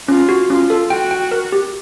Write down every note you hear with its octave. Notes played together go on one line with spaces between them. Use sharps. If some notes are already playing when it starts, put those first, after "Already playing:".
C#4 F4
F#4
C#4 F4
A4
F#4 G5
G5
A#4
G4